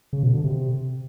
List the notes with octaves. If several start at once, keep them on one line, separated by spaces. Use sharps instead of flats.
C#3
B2
D3
C3